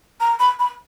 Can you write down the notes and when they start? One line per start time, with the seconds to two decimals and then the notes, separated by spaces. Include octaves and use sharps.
0.20 A#5
0.39 B5
0.59 B5